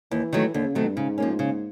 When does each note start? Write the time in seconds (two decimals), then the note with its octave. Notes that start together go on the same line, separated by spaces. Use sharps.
0.11 D#2 E3
0.33 D#3 F#3 A3
0.54 D#2 D3
0.65 C#3
0.75 C3 D#3 F#3 A3
0.85 G2
0.97 G#2 C#3
1.18 F3 A#3 C#4
1.39 C#3